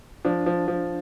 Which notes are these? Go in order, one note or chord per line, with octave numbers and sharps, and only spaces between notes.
F3 D4
F3
F3